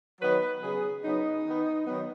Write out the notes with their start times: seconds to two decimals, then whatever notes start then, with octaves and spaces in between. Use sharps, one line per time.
0.21 D#3 F#3 B3 B4
0.63 C#3 F#3 B3 G#4
1.04 C#3 F#3 B3 D#4
1.45 D#3 B3
1.86 D#3 F#3 B3